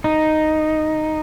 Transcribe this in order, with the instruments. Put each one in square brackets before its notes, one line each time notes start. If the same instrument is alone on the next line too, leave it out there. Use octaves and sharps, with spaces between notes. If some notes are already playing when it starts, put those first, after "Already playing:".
[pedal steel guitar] D#4